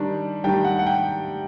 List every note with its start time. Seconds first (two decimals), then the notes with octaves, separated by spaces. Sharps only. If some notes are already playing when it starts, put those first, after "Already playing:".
Already playing: D#3 G3 D4
0.44 D#3 G3 D4 G5
0.64 F#5
0.79 F#5
0.87 G5